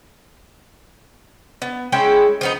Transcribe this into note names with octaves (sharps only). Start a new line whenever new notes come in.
B3
G#3 C#4 E4 G5
F3 B3 D#4